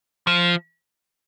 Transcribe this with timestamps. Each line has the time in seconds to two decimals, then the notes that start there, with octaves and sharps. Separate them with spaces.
0.27 F3